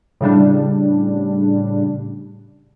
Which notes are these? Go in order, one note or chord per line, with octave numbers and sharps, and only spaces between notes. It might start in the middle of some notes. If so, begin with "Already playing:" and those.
A2 C#3 G3 D4